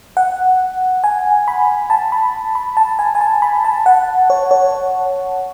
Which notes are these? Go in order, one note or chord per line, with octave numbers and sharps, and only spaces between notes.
F#5
G#5
B5
A5
B5
B5
A5
G#5
G#5
A5
B5
A5
F#5
C#5
C#5